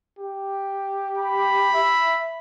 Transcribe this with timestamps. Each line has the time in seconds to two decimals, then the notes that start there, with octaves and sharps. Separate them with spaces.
0.19 G4
1.18 B5
1.74 E5